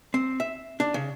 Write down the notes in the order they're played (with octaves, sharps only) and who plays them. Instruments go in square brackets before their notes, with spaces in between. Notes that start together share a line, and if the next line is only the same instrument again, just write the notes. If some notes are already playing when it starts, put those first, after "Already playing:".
[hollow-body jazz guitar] C4
E5
D4
C#3